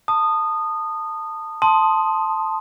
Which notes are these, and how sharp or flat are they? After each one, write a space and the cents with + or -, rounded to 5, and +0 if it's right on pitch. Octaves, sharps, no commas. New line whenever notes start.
A5 +20 D#6 -20
A5 +0 C6 +0 D#6 +0